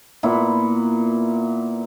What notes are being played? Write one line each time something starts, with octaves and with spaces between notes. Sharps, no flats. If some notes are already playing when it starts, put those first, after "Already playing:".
A#2 B3 E4